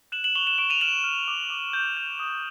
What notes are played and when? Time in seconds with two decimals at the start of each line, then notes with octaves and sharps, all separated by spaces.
0.12 F#6 E7 F#7
0.24 E7 F#7
0.35 C#6 F7 G7
0.47 E7 F#7
0.58 C#6 D7 E7
0.70 D#7 F7
0.81 F6 E7 F#7
1.04 F6
1.28 D6
1.50 D6
1.73 G6
1.97 G6
2.20 D#6